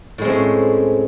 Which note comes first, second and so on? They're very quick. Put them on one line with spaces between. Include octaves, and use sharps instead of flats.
A2 G#3 C4 C#4